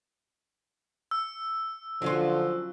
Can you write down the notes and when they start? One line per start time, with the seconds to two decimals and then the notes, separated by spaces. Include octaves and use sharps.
1.11 E6
2.02 D3 F3 F#3 C#4 F4